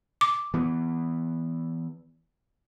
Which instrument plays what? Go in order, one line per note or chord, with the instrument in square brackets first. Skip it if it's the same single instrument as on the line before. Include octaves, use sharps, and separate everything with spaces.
[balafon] D6
[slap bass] E3 B3